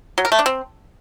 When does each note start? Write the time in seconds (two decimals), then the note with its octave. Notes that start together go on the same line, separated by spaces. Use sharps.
0.18 F#3
0.25 A#4
0.32 A3
0.39 D4
0.46 C4